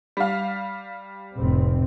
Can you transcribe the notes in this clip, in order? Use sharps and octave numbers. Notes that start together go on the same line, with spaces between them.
G3 F5
F1 A2 C4